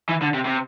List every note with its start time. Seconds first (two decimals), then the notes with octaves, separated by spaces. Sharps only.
0.09 E3
0.22 D3
0.34 C3
0.45 C3